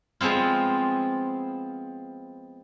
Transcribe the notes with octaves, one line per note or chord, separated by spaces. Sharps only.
F3 G#3 B3 C4 F4